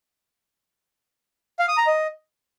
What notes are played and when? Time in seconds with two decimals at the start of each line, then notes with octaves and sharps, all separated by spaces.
1.59 F5
1.68 D#6
1.78 A#5
1.87 D#5